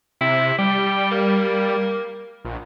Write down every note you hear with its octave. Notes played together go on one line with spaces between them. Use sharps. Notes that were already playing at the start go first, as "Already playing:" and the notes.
C3 E4
G3 G4
A#3
A#1